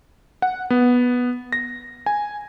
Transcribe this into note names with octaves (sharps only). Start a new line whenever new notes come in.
F#5
B3
A#6
G#5